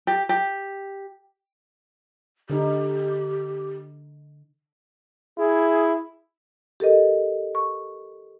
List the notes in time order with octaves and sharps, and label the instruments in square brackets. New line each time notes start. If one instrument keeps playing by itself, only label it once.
[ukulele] G4
G4
[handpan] D3 D#4 [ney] G4
[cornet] E4 [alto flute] G#4
[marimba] G4 A4 A#4 D#5
C#6